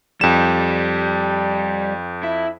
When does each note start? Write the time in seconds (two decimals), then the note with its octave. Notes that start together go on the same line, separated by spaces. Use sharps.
0.21 F2 G3 E7
2.23 E4